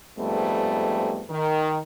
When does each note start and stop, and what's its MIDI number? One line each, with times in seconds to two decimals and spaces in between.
0.18 1.23 41
0.18 1.23 44
0.18 1.23 55
0.18 1.23 57
0.18 1.23 59
1.29 1.78 51